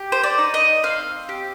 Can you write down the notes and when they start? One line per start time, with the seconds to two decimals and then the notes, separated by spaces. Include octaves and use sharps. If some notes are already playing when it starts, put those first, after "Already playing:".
Already playing: G4
0.12 C5
0.23 D5
0.38 D#4
0.54 D#5
0.83 C4 F5
1.29 G4